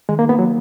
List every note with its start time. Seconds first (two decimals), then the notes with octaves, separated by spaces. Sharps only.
0.09 D#3 G#3
0.19 A#3
0.29 A#3 B3
0.39 F#3